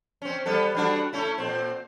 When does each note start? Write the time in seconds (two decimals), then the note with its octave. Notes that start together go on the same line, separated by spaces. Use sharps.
0.22 C4 C#4
0.46 G3 B3 A4
0.75 G3 D4 F#4
1.13 A3 C#4 E4
1.38 A#2 C4